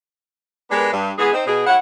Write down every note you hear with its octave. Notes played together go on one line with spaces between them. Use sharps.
G#3 B3 D4 G4 A#4 B4
G2 G3
E3 G#3 B3 G#4
C4 D#4 C5
B2 G#4
G3 E4 C#5 F#5